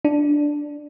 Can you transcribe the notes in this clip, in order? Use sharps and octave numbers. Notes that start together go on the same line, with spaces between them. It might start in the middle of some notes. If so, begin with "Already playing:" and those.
D4